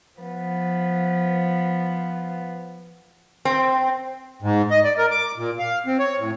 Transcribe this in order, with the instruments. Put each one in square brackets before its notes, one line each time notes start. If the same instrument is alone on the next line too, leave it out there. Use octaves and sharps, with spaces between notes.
[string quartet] F3 B3
[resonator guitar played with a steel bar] C4
[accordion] G#2
D#5
D5
A#4
D6
A#2
F5
C4
C#5
A2